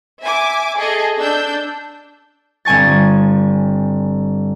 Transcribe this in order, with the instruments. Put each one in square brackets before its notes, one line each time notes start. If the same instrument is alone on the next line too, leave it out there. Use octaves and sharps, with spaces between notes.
[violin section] E5 G#5 D6
G#4 A4 D#5
D4 E6 G6
[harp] G1 C4 G#5 C#6 A6